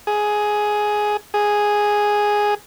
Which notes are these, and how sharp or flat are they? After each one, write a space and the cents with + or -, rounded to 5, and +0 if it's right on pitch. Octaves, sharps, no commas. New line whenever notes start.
G#4 +10
G#4 +0